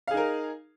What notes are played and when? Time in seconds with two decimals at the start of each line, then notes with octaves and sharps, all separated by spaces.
0.07 F5
0.11 G#4
0.14 D#4
0.17 A#4